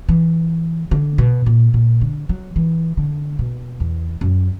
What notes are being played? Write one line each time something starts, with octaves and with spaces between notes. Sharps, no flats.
E3
D3
B2
A#2
A#2
D3
F#3
E3
D3
B2
E2
F#2